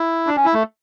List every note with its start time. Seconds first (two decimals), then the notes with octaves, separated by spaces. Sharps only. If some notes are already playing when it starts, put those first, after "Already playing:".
Already playing: E4
0.27 D4
0.37 C#4
0.45 E4
0.54 A3